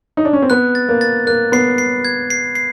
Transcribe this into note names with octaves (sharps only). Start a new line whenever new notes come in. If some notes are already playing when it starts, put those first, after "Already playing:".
D#4
D4
C#4
C4
B3 F#6
A6
A#3
A6
A#3 F#6
B3 C7
C7
G#6
C7
C7